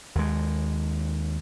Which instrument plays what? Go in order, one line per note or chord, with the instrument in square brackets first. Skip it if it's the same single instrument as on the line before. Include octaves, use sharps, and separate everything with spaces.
[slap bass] D#2 G#3